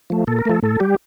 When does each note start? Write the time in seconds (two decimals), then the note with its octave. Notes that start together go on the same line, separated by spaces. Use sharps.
0.10 F3 A3
0.27 A#2 A4
0.39 A#4
0.45 F3 A3 A4
0.63 A2 A4
0.80 G3 G4